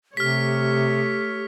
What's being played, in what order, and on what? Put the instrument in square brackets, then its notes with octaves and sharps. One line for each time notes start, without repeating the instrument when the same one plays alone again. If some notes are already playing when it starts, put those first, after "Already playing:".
[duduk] C3 [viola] A3 C#5 [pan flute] G4 [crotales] F6 B6